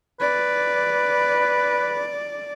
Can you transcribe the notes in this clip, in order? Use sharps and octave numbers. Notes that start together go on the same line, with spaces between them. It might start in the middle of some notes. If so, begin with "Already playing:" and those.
B4 D5